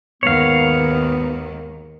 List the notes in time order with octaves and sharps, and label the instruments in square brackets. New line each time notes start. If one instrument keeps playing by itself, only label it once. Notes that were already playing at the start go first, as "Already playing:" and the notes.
[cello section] D#2 G#2 D#3 [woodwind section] B3 [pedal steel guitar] C#5 F5